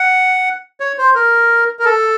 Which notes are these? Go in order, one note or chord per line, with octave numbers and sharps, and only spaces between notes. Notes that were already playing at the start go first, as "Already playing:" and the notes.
Already playing: F#5
C#5
C5
A#4
A#4
A4